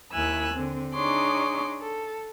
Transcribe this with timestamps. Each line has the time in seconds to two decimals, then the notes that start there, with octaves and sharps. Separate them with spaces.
0.13 D#2 E4 G#5 E6 F#6
0.54 D3 C4
0.93 D4 D#4 G#4 C#5 C6 D6
1.80 A4